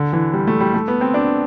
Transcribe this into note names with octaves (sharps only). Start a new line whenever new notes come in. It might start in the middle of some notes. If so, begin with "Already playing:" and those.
Already playing: D3
E3
G3
A3
G3
A3
B3
C4
D4